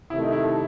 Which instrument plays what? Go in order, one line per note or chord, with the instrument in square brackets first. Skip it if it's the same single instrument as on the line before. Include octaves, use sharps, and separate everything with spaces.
[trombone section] C3 D#3 A3 [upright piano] E4
[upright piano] D#4
E4
A4